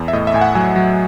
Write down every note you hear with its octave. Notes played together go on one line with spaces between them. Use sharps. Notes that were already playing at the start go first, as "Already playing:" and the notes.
Already playing: E2
E5
A2 D#5
E5
A2 G#5
F#5
F#3 G#5
F#3